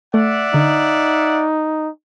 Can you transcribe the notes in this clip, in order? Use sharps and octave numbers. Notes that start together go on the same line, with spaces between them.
A3 D5 E5 F#5
D3 D#4